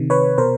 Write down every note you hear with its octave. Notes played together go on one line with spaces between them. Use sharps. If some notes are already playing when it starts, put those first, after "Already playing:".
Already playing: C3 D#3
B4 C#5
B2 A#4 C5